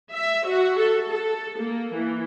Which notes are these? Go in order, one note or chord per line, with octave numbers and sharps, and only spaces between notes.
E5
F#4
A4
A4
A#3
E3